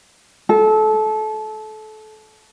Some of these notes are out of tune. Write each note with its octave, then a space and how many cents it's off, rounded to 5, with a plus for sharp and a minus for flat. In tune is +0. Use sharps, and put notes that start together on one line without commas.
A4 -25